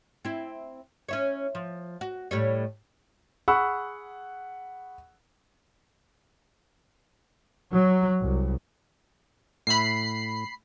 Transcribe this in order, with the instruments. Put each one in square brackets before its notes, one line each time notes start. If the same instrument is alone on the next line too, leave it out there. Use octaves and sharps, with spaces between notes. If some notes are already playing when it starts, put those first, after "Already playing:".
[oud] C4 E4
C#4 E4 C#5
F3
F#4
A2 G3 C#5
[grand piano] G#4 F#5 B5 C#6 E6 F#6
[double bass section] F#3
C2
[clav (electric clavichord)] A2 E5 [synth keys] B5 C7